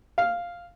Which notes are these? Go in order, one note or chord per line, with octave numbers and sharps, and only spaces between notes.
F5